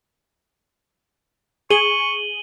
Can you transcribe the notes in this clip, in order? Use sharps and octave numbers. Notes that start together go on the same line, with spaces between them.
G#4 C#6 D#7 F#7 G7